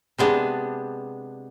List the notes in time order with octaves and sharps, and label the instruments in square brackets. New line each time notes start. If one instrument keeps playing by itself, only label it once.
[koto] C3 G#3 B3 D4